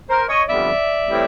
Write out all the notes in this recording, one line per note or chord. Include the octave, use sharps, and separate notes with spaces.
A#4 C5
C#5 D#5
F2 D3 G3 B3 D5 E5
A2 E3 G3 C4